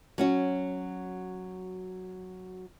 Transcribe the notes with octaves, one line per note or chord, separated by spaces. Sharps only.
F#3 C#4 F#4